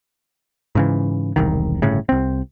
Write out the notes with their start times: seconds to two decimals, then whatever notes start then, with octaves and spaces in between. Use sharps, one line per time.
0.75 G#2 C#3 E3
1.36 E1 C2 D#3
1.82 G1 A2 C#3
2.09 C2 C4